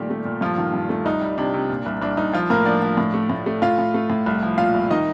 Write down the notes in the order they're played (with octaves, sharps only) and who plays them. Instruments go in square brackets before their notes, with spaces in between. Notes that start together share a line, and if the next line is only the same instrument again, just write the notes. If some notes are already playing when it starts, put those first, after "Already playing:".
Already playing: [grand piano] A#2 D#3 G3 A3 G4
A3
A#2
G2 F3 F4
D#3
G2
A3
C2 D#4
G3
C3 D4
C3
A#2
C2
C2 D4
C2 D#4
F3 F4
A2 A#3 A#4
F3 D4 D5
F3
A2
A3
A2
A3
A2 F4 F5
A2
A3
A2
C2
F3
A#2 F4 F5
C2
D#3 D#4 D#5